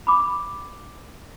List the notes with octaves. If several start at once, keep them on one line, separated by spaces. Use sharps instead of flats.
B5 D6